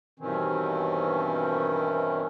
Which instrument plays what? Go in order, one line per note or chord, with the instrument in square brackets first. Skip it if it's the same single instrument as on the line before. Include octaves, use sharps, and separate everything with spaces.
[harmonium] G2 B2 D#3 E3 C4 C#4